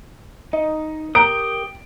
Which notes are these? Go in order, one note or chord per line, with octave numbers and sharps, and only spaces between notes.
D#4 D#5
G4 A#4 G5 D#6 D7